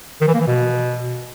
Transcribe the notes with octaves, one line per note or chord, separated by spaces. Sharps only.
D#3
E3
A#3
E3
B2